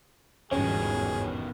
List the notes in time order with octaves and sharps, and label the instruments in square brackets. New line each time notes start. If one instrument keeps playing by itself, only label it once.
[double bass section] G1 E2 G#2 [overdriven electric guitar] B2 D#3 [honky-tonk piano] C#4 [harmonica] G#4